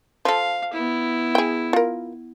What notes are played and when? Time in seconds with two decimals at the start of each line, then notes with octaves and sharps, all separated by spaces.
0.25 F3 A4 F5
0.73 B3 E4
1.35 G#4 G5
1.73 F4 A#4